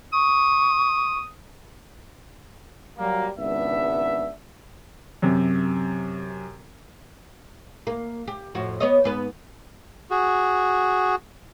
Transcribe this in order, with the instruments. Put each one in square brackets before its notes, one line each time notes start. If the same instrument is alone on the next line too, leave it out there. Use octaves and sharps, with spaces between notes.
[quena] C#6 [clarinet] D#6
[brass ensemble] F#3 G3 A#3
G#1 C#2 B3 D4 E5
[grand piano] F#2 C3
[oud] A#3
G4
F2 A2 F#4
B3 C#5 D#5
G#2 B3 B4
[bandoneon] F#4 G#4